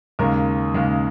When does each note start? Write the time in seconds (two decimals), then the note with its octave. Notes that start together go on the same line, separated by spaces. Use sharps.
0.19 D#2 C#3 G#3 A#4
0.74 D#2 C#3 G#3